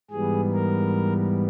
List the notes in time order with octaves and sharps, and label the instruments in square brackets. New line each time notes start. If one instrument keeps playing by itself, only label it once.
[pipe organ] G#2 E3 G3 B3 G#4
A#4